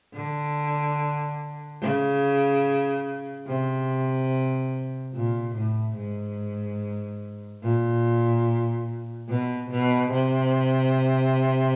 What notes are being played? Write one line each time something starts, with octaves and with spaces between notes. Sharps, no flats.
D3
C#3
C3
A#2
A2
G#2
A#2
B2
B2
C3